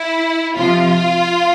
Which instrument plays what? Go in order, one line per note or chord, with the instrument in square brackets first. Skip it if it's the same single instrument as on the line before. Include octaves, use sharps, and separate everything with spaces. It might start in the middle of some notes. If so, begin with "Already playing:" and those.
Already playing: [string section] E4
C3 F3 F4